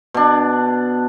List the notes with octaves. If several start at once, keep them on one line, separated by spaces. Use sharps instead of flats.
B2 D4